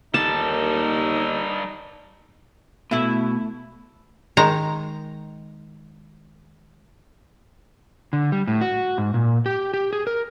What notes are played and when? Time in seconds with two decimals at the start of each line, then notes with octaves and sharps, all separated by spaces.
0.14 D#2 G3 D#4 A4 A5
2.91 B2 A3 E4
4.37 D#3 G#3 A#5
8.13 D3
8.32 G3
8.47 A2
8.61 F#4
8.98 G#2
9.14 A#2
9.46 G4
9.74 G4
9.93 G#4
10.07 A#4